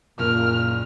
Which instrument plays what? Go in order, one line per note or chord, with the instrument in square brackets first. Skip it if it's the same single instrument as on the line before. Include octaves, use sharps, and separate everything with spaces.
[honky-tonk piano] F#1 A#4 [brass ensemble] A#2 [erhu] F6